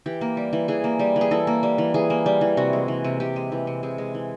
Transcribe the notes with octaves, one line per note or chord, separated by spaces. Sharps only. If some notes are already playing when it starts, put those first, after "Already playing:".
E3 G4
A#3
G3
E3
E3 G#4
A#3
G3
E3
G#4
E3 A4
A#3
G3
E3
E3 G#4
A#3
G3
E3
C3 F#4
G#3
E3
C3
C3 G4
G#3
E3
C3
C3 G#4
G#3
E3